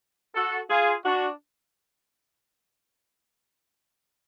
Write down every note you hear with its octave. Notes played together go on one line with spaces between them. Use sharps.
F#4 A4
F4 G#4
D4 F#4